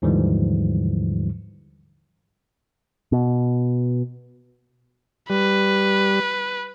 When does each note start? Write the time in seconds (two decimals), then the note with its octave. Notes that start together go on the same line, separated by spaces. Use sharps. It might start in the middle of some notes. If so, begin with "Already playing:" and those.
0.02 D#2 G#2 D3 E3 F3 G3
3.12 B2
5.30 G3 B4